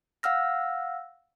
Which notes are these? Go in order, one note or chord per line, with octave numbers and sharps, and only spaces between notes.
F5 F#5 E6 F6 A#6